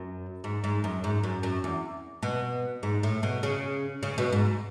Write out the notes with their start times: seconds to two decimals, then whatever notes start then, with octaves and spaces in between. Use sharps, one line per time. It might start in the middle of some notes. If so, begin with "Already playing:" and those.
Already playing: F#2
0.44 G#2
0.64 G#2
0.84 F#2
1.04 G#2
1.24 F#2
1.43 F#2
1.64 E2
2.23 B2
2.83 G#2
3.03 A2
3.23 B2
3.43 C#3
4.03 C#3
4.18 B2
4.32 G#2